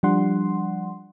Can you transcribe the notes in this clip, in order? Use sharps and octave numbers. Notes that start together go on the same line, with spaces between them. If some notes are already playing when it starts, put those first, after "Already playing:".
F3 G3 D4 F#5 C6